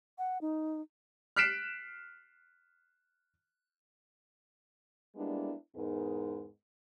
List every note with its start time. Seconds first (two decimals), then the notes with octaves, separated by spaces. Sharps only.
0.18 F#5
0.41 D#4
1.36 F6 F#6 B6 C7 D7 E7
5.15 G3 G#3 A#3 B3 D4 E4
5.75 E2 G#2 G#3 B3 D#4 A#4